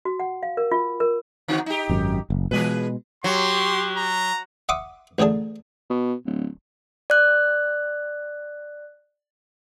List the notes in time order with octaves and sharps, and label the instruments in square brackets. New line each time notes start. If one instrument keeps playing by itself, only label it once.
[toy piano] F#4
F#5
F5
A#4
F4
A#4
[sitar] D3 C4 F#4
D#4 G4
[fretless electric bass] G#1 F#2
F#1
[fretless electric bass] B2 G#3 [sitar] E3 G#4 B4
[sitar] F#3 [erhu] G4 [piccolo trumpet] C6
[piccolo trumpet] A#5
[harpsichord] E5 F#5 C6 D6 D#6
A1 A2 D3 G#4 A5
[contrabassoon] B2
D1
[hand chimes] D5 F#6